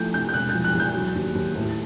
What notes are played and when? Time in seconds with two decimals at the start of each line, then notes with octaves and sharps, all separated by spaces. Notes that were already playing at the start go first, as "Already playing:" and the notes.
Already playing: F3 A3 G6
0.14 C3 G6
0.29 G6
0.34 E1 F#6
0.49 G6
0.54 F3
0.64 F#6
0.75 E2
0.80 G6
0.95 F#3
1.15 D#2
1.35 D#2
1.56 A2